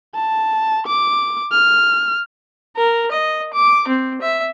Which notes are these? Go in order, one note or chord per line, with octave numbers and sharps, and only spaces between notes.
A5
D6
F6
A#4
D#5
D6
C4
E5